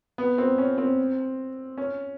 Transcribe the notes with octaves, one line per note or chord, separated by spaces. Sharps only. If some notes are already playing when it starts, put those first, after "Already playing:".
B3
C4
C#4
C4
C#4